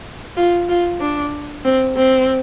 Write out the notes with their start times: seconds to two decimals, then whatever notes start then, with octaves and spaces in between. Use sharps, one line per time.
0.37 F4
0.69 F4
1.00 D4
1.64 C4
1.96 C4